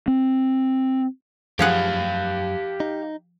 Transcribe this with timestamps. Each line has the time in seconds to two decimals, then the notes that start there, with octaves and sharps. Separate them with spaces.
0.08 C4
1.59 F#2 F3 G4 G#4 F5 F#5
2.80 D#4